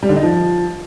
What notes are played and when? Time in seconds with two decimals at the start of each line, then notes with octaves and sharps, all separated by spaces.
0.03 G3
0.09 D3
0.16 D#4
0.23 F3